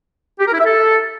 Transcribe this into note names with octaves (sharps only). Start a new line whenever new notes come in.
G4
A#4
E4
E5
A4